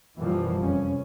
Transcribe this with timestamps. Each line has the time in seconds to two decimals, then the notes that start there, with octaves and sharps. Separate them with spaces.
0.17 F#2 B2 E3 F3 G3 A#3
0.60 F1 C#4